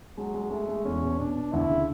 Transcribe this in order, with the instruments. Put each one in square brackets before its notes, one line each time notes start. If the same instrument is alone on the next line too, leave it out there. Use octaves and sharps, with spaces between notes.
[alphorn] F#3 [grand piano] G#3
[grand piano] G#3
[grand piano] G#3 [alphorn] A3
[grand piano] G#3
[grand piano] E2 [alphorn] C#4
[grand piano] B2
[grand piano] B2 [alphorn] D4
[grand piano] B2
[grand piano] D2 [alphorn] E4
[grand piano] C#3